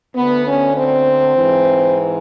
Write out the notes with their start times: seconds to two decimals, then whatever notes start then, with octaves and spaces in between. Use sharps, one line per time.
0.16 D2 D3 B3
0.45 C#4
0.75 C4
1.35 G#2 E3